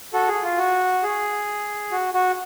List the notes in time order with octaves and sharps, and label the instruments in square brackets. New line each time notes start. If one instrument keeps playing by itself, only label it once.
[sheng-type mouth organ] F#4 A4
G#4
F4
F#4
G#4
F#4
F#4